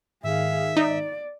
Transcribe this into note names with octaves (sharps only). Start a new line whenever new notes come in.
G#2 D#3 G#4 E5 F5
D#4 D5